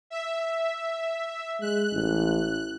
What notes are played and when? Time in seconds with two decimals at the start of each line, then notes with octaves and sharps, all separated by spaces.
0.10 E5
1.61 G#3 F#6
1.92 A1